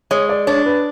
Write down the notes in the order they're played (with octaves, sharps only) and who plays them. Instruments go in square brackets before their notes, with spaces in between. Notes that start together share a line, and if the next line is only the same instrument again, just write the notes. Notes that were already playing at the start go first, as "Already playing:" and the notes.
[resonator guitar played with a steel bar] G#3 [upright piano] C#5
[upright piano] D5
[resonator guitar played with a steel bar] D4 [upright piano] C#5
[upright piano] B4